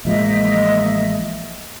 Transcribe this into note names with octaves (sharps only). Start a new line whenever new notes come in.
A1 F3 G#3 A#3 D#5 E5